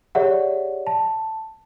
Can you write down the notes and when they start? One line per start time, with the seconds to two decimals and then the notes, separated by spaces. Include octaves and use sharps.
0.15 G4 G#4 C#5 D5 E5 F#5
0.87 A5